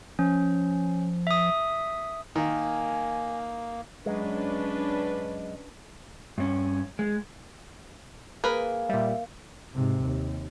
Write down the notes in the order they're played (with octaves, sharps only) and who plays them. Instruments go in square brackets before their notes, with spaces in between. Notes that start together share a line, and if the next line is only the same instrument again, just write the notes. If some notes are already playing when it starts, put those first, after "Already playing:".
[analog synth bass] F3 [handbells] C#4
[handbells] E5 D#6
[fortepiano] D#3 [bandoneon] A#3 [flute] G#5
[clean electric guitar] F#2 G#3 [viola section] C#4 D4 B4
[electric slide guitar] G2 C#4
G#3
[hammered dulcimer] A#3 [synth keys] G#4 [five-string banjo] A#4 B4
[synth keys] A#2 G3 [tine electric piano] E5
[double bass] G#2 C3
D#2